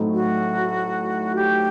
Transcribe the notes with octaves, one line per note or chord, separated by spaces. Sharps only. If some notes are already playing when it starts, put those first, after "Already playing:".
Already playing: A2 F#3 A3 C4 D#4
F#4
G4